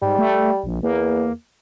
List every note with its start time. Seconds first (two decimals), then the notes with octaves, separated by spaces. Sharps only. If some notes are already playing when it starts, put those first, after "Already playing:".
0.02 G#2 G3
0.19 A3
0.64 A#1
0.83 E2 A#3